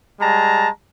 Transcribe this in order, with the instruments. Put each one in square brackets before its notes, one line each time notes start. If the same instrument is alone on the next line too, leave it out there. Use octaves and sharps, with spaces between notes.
[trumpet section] G3 G#3 A5 A#5